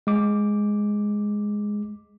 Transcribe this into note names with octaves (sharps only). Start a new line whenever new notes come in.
G#3 D6